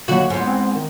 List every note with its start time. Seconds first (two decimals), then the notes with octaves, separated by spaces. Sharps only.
0.08 D#2 D3 F#3 F#4
0.30 E2 G#2
0.47 C4
0.75 D#3